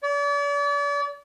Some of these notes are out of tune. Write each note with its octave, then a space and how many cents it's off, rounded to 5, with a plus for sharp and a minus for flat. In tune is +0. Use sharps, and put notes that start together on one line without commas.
D5 -40